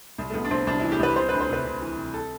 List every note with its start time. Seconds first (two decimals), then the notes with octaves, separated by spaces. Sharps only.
0.18 C2
0.30 A3
0.34 C2 B3
0.45 D4
0.51 C2 C4
0.67 C2 D4
0.80 E3 E4
0.92 G4
0.99 C2 B4
1.16 C3 C5
1.29 D2 B4
1.40 C5
1.49 C3 B4
1.65 C3
1.82 E3
1.98 C3
2.14 A4